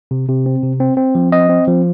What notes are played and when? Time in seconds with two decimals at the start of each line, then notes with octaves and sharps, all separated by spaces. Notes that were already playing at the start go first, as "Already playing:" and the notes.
0.11 C3
0.29 C3
0.46 C4
0.63 C3
0.80 C4
0.97 C4
1.15 F3
1.32 C4 D#5
1.49 C4
1.68 F3